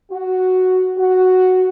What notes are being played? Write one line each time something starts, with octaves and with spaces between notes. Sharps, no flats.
F#4
F#4